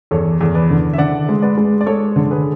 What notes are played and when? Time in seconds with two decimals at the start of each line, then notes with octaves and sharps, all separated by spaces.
0.11 E2 A4 C#5
0.41 E2
0.55 B4 D5
0.70 D3
0.93 E5
0.98 D3 D5 F#5
1.29 G#3
1.42 B4 D5
1.58 G#3
1.81 D5
1.86 G#3 A4 C#5
2.16 D3
2.31 G#4 B4